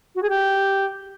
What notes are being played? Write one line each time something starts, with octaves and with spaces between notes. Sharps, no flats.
F#4
G#4
G4